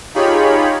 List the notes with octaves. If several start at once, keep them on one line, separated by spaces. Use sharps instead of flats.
D#4 F4 G4 G#4 C#5 B5